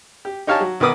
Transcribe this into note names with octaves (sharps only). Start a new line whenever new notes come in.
G4
D#4 G4 C#5 F5 G#5 A5
F#3
B1 D#3 B3 B4 D6 D#6